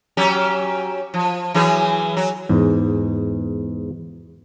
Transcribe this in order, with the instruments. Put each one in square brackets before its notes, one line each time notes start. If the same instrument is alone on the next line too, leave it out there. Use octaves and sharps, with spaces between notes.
[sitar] F#3 C#4 G4
F3
E3 F#3 G#4
F#3
[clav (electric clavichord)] E2 G#2